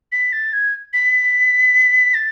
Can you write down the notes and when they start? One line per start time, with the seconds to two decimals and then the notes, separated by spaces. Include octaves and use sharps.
0.12 B6
0.32 A6
0.53 G#6
0.93 B6
2.14 A6